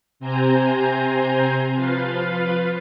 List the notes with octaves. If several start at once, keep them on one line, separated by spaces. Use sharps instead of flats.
C3 C4 C5 G#5 A#5 G6
F3 F4 B4 F5